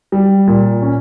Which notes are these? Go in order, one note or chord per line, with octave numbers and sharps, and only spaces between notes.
G3
A#2
C#4